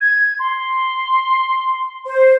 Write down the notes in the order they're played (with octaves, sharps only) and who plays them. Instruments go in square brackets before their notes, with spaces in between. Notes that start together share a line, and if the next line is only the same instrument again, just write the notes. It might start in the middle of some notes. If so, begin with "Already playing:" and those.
[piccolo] G#6
C6
[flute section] C5